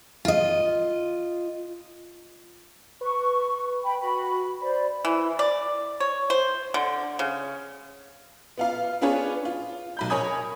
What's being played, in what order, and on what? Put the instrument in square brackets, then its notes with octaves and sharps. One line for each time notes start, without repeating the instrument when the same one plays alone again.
[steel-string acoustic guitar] F4 D#5
[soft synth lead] B4 [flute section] C#6
[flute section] G5 B5
F#4 B5
[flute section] C5 D5 [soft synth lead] B5
[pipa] E3
D5
C#5
C5
D3
C#3
[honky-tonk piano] B3 F4 F5
B3 D4 F4 G#4 B4 C#5
F4
B1 B5 G6
A#4 C#5 G#5 B5 D#6 G#6